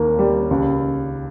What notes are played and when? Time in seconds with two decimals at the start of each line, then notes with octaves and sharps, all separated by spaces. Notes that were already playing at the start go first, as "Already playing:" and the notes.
Already playing: D#2 A#3
0.19 G3
0.51 C#2